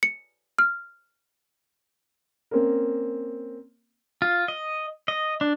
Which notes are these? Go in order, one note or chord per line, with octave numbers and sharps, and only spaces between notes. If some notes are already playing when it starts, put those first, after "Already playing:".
C#7
F6
A#3 C4 C#4 A#4
F4
D#5
D#5
D4